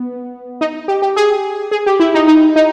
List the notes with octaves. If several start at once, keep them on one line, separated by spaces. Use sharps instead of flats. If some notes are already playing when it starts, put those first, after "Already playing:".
Already playing: B3
D#4
G4
G4
G#4
G#4
G4
E4
D#4
D#4
D#4